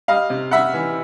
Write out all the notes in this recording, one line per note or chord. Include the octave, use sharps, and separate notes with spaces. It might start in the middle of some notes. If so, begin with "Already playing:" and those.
G3 D#5 F5
C3
G3 E5 F#5
E3